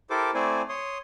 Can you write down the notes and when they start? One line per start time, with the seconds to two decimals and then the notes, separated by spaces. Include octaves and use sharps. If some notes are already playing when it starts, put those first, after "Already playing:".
0.10 E4 G4 A4 A#4 C5 D6
0.34 A3 C4 E4 C5 D5 G#5
0.69 C#5 C6 D#6